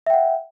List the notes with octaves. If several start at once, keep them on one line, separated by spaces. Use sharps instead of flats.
E5 F#5 G5